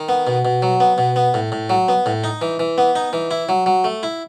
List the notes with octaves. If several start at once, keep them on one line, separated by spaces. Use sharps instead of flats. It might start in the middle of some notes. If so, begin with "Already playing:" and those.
Already playing: D#3
B3
B2
B2
F#3
B3
B2
B3
A2
A2
F#3
B3
A2
D#4
E3
E3
B3
D#4
E3
E4
F#3
F#3
A3
E4